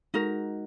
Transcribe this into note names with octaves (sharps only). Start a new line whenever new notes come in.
G#3 D#4 F#4 A#4